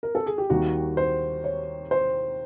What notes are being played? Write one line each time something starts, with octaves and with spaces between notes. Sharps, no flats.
A#4
A4
G#4
G4
D#2 D#3 G3 F#4
C5
C#5
C5